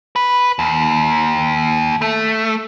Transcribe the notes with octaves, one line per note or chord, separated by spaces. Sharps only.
B4
D#2
A3